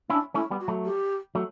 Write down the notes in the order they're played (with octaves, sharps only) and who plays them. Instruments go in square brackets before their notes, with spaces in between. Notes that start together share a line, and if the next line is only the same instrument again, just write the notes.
[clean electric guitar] C#4 E4 [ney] D4
[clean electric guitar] A3 C#4 [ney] E4
[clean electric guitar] G3 B3
[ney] F#4
[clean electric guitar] F#3 A3
[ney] G4
[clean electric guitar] F#3 A3